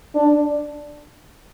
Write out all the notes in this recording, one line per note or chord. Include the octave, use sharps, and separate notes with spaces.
D4